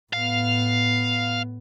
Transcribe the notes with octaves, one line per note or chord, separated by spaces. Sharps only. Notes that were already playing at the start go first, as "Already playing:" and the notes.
A2 B3 F5